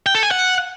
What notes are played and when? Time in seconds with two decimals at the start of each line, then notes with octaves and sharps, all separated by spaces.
0.06 G5
0.15 A4
0.23 G#5
0.31 F#5